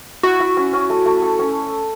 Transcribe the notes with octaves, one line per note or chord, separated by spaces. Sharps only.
E4 F#4
E4
C#4
C#4
A3
A3
A4
C#4